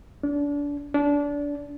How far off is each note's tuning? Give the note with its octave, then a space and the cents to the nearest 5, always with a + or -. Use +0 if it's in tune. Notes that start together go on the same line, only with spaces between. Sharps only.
D4 -30
D4 -25